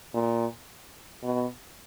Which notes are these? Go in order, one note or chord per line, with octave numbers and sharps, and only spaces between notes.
A#2
B2